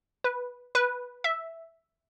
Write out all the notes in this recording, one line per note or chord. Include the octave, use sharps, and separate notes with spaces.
B4
B4
E5